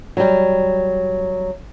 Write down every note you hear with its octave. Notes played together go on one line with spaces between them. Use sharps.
F#3 G3